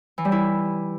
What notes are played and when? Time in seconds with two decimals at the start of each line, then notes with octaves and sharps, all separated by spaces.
0.18 E3
0.25 G3
0.32 E4